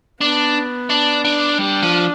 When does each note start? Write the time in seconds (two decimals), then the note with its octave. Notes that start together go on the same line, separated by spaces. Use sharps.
0.21 B3 D4
0.90 D4
1.25 D4
1.58 G3 D4
1.83 F3